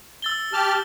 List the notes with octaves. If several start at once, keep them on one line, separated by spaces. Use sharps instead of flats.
E6 A6 G7
G4 A5 F6